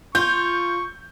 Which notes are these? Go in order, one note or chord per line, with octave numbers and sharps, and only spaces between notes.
F4 C#6 G6